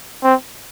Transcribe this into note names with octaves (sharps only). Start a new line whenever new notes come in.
C4